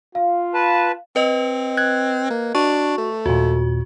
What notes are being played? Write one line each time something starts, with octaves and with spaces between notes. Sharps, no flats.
F4 F5
B4 A5
C4 B4 D#5
F#6 G#6
A#3
D4 F#4 C#6
A3
D#2 A#2 F#4